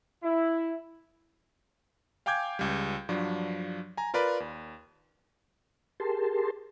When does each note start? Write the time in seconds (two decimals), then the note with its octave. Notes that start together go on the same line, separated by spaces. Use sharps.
0.23 E4
2.26 F5 G5 G#5 D6 G6 G#6
2.59 C#2 G3
3.09 G2 F3 F#3 D4
3.97 G#5 A#5
4.14 F4 A#4 B4 D5 B5
4.40 D#2
6.00 G4 G#4 A#4 A5 C6